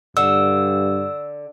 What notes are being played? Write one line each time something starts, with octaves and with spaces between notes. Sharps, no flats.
G2 D3 E6